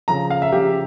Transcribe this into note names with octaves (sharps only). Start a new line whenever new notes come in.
C#3 F3 A#5
F5
E5
C#3 F3 G4